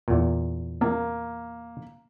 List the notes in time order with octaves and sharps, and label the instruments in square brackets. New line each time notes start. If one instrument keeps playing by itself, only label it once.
[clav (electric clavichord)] E2 A#2
[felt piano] A#3